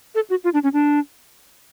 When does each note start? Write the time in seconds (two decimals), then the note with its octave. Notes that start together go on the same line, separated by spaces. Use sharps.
0.15 A4
0.30 F#4
0.44 F4
0.54 D4
0.64 C#4
0.73 D4